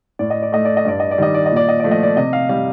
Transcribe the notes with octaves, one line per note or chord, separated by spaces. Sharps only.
A2 D5
D#5
D5
A3 D#5
D5
D#5
G2 D5
D#5
D5
D#3 G3 D#5
D5
D#5
A#2
D5
D#5
F3 A3 D5
D#5
D5
C3 D#5
F5
G3 F5